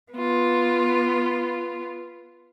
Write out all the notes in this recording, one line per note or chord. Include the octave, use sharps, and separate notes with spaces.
B3 F4